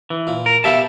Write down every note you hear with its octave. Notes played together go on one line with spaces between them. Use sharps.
E3
A#2
A#4
B2 G3 G4 E5 F5 A5